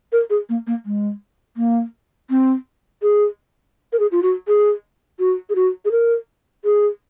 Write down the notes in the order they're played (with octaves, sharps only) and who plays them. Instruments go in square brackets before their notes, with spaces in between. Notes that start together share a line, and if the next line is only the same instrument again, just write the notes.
[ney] A#4
G#4
A#3
A#3
G#3
A#3
C4
G#4
A#4
G#4
F4
F#4
G#4
F#4
G#4
F#4
G#4
A#4
G#4